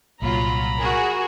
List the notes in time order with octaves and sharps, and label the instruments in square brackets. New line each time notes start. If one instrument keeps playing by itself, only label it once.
[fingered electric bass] C2 A#2 [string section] F#3 F4 [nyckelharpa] A#5 B5
[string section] F#4 G#4 A#4